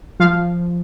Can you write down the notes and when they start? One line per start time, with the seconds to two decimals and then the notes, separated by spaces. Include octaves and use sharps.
0.20 F3 F5